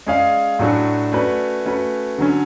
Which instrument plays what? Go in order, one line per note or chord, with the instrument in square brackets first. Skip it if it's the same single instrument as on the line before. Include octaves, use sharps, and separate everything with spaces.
[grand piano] G#3 C#4 G#4 D5 F5
A2 F#3 A3 D4 F#4
A3 C#4 F#4 B4 D5
A3 C#4 F#4 B4
D3 F#3 C#4